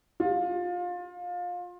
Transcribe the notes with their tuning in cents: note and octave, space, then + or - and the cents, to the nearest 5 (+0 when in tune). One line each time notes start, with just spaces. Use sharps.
F4 +25